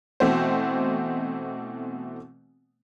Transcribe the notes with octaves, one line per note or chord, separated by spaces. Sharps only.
B2 E3 A3 C4 F#4 C5